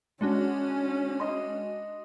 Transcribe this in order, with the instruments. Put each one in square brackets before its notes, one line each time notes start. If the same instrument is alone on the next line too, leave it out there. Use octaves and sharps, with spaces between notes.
[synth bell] G#3 D4 F#4 [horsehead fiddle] C#4
[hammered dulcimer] D#5 C6